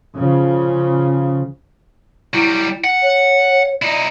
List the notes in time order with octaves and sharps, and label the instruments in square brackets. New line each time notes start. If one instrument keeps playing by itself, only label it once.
[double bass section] C#3 F3
[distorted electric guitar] F#3 G3 [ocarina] E4
[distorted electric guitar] F#5
[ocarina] C#5
[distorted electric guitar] D#4 E4 [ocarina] D5